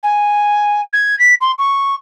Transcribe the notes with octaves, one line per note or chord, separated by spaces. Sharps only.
G#5
G#6
B6
C6
C#6